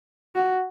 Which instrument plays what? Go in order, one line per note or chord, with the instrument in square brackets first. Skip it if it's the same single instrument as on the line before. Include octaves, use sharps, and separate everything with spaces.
[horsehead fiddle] F#4